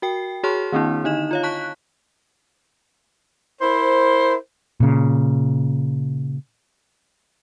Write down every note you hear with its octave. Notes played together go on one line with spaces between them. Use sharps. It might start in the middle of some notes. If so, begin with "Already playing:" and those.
F#4 A#4 G5 C7
F#4 G#4 C#5 A5 C6 F6
D#3 A#3 C4 D4 E4
D3 D#4 D#5 E7
F4 C#5 F5
A5 C#6 F#6 B6
E4 A#4 C5
A#2 C#3